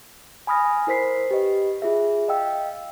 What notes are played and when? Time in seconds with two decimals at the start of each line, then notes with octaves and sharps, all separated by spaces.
0.47 G#5 B5 D#6 F6 A#6
0.87 E4 A#4 C5 B6 C7
1.31 G4 B4 D#5
1.82 F4 G#4 E5
2.28 D#5 F5 G5 E6